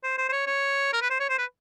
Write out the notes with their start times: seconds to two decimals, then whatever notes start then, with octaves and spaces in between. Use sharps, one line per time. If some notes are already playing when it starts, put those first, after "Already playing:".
0.04 C5
0.18 C5
0.29 C5
0.32 C#5
0.47 C#5
0.93 A#4
1.02 B4
1.11 C5
1.20 C#5
1.29 C5
1.38 B4